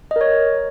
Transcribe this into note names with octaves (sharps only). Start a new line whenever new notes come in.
A#4 C#5 D#5